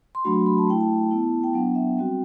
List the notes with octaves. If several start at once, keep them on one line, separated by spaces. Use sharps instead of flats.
C6
F#3 A3 D4 F#4 B5
B5
A5
A3 E4 G5
A5
B3 E4
G5
F#3 B3 D4 F#5
E5
G3 C4 F#4 G5